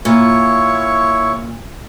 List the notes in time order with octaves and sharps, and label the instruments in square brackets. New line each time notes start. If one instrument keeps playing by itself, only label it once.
[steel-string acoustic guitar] A#2 [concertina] E4 C#5 C#6